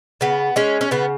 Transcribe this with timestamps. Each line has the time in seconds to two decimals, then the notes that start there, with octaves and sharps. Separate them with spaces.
0.21 C#3 B3
0.56 G#3 C#4
0.81 C#4
0.91 C#3 B3